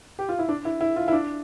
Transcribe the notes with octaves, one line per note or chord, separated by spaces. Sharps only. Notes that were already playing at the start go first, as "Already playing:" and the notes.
G4
F4
E4
D4
E4
E4
F4
E4
D4